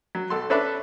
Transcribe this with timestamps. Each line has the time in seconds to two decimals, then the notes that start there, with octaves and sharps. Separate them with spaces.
0.15 F#3
0.30 B1 A4 C6
0.50 C#4 D4 A4 B4 D5 E5